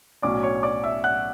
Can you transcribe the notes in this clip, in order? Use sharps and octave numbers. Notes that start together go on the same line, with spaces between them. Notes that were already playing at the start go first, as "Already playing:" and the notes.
B1 A2 F#3 C#4 D5 D6
C#5 C#6
D5 D6
E5 E6
F#5 F#6